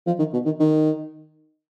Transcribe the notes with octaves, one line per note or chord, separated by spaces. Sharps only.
F3
D#3
B2
D#3
D#3